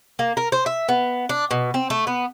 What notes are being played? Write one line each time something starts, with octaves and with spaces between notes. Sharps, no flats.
A#3
A#4
C5
E5
B3
D4
B2
C4
A3
B3